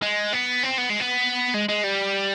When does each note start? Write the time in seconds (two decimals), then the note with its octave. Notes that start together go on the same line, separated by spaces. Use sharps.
0.02 G#3
0.33 B3
0.64 C4
0.78 B3
0.90 G#3
1.00 B3
1.54 G#3
1.69 G#3
1.84 G3